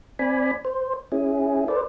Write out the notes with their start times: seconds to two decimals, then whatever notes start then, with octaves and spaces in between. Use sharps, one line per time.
0.19 C4 D5 G#5 B5
0.65 C5
1.12 C#4 E4 G#4
1.68 A4 B4 C5 D5